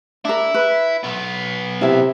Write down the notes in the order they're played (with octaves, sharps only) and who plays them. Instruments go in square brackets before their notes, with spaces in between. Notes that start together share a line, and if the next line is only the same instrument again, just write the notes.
[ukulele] D4 A#4 [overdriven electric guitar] E4
[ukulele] B4
[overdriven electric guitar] B1 B3
[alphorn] C3 [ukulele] E4 E5